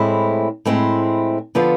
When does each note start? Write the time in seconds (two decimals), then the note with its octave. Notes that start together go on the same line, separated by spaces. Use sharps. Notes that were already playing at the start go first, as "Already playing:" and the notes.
Already playing: A2 G#3 C4 E4
0.65 A2 G#3 C4 E4
1.55 D3 F3 B3 F4